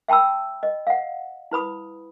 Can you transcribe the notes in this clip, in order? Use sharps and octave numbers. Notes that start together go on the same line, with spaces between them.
E5 G5 A5 B5 E6
D#5
F5 F#5
E4 B4 B5 D#6